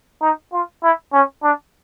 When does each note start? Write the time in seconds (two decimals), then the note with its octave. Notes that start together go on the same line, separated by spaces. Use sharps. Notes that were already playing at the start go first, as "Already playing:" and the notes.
0.22 D#4
0.53 F4
0.83 E4
1.13 C#4
1.43 D4